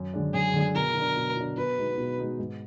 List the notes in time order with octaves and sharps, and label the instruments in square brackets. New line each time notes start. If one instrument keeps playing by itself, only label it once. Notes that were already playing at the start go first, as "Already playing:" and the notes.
Already playing: [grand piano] F#2
D3 G#3 D4
[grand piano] F#2 [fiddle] G#4
[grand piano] D3 G#3 D4
[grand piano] B2 [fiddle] A#4
[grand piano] F#3
D4
B2
F#3 D4
[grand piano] B2 [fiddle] B4
[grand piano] G#3 B3 D#4 F#4
B2
G#3 B3 D#4 F#4
G#2